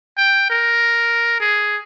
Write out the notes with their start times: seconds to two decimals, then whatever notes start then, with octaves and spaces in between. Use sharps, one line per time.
0.18 G5
0.50 A#4
1.40 G#4